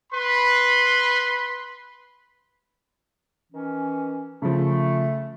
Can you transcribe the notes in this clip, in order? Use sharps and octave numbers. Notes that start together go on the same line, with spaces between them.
B4 B5 C6
D#3 E3 C#4
C#3 F3 A3